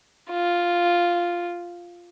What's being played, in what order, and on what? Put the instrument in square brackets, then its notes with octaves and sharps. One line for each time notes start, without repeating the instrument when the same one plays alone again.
[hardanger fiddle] F4